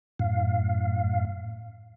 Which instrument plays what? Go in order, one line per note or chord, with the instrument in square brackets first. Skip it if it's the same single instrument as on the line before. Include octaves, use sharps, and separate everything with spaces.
[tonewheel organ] F#2 A2 F5